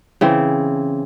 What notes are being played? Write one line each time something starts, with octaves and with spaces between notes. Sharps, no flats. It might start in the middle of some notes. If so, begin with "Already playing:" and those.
C#3 E3 C4